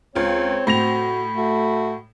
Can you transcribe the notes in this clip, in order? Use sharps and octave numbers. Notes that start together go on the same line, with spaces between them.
C#2 C4 F4 C#5
A2 F#4 B5 A#6 F7
A3 F#4